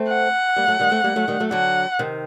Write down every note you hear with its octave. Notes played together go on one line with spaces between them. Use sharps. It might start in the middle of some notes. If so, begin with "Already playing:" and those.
Already playing: A3 C4
F#5
G3 A#3
F#3 A3
D#3 G3
A3 C4
G3 A#3
F#3 A3
D#3 G3
F#3 A3
D3 F#3 F#5
C3 D#3